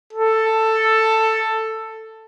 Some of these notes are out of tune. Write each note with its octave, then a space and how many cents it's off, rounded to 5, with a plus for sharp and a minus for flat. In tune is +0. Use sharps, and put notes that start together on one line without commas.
A4 +10